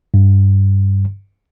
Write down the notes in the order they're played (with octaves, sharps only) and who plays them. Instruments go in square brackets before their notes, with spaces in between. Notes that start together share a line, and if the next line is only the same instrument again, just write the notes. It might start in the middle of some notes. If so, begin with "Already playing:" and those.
[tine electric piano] G2